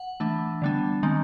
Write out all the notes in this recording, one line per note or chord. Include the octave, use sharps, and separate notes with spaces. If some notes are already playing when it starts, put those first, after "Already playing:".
Already playing: F#5
E3 A3 D4
D3 G3 B3 D4
D#3 G#3 C4